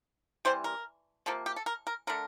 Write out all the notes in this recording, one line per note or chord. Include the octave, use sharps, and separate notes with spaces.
C3 E3 G3 C5
A#4
C3 F3 A#3 A4
G4
A4
A#4
A#4
D3 A3 A#4